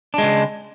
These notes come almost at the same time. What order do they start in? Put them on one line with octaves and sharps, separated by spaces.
D4 G#3 C#3